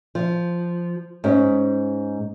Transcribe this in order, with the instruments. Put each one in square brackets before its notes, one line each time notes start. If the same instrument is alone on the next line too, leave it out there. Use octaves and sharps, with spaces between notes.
[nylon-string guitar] F3
G#2 C#4